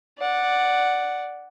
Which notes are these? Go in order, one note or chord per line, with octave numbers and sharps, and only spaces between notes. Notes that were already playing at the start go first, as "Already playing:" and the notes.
D5 F#5